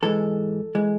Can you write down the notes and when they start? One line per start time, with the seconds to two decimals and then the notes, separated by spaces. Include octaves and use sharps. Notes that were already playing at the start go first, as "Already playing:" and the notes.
0.02 G#2 E3 G#3 A4
0.75 E3 G#3